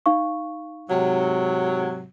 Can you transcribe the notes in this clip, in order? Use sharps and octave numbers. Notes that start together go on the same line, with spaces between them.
D#4 F5 C#6
G#2 C3 F#3